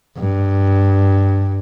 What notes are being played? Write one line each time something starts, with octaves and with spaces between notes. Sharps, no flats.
G2